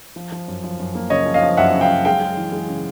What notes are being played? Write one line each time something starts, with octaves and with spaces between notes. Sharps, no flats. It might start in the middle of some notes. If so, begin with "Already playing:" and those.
F3
F3
F#2
F3
F#2
A#3
C#3 C#5 D#5
F3
D#5 F5
F3
F#2 E5 F#5
C#3
F5 G5
F#2
G#3 F5 G5
G#3
E3
G#3
C#3